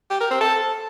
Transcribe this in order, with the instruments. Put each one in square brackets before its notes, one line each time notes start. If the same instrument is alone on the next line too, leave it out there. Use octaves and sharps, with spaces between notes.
[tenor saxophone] G4
A#4
C4
A4